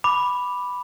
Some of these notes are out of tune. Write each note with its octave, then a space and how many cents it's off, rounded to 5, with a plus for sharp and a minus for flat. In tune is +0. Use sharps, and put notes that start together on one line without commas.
B5 +0 D6 +0